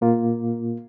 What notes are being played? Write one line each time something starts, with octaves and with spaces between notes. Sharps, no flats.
A#2 A#3 F4